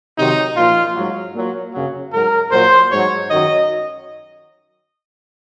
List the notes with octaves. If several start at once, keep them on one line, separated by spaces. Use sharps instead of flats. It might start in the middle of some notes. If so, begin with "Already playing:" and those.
C3 D#3 F#3 D#4
A#2 F3 F4
G#2 F#3
A#2 F#3
F#2 C#3 F#3
G#2 F#3 A#4
A#2 F#3 C5
G#2 F#3 C#5
F#2 D#3 F#3 D#5